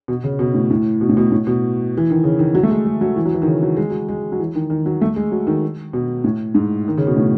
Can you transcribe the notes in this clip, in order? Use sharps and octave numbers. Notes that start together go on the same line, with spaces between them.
B2
C#3
B2
A2
A2
B2
A2
B2
A2
B2
E3
D#3
C#3
D#3
F#3
A3
G#3
G#3
F#3
E3
F#3
E3
D#3
C#3
F#3
G#3
F#3
G#3
F#3
E3
D#3
D#3
F#3
A3
G#3
F#3
D#3
B2
A2
G#2
D#3
C#3
B2
A2